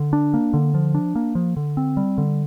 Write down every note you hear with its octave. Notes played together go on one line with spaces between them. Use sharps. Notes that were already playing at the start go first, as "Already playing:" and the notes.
Already playing: D3
D4
A#3
D3
F3
D4
A#3
F3
D3
C4
G3
D3